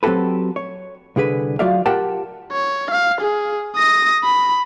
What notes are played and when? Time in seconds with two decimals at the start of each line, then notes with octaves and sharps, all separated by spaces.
0.03 F#3 C4 F#4 G4 A4 B4
0.56 C#5
1.16 C2 D3 G#4 B4
1.59 F#3 F4 F#4 D5 E5 F5
1.86 F4 G4 A#4 F#5 G5 A5
2.52 C#5
2.91 F5
3.21 G#4
3.77 D#6 A#6
4.24 B5